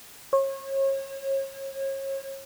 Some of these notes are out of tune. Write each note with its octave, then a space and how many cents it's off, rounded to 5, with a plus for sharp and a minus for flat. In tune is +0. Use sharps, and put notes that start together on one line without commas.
C#5 -35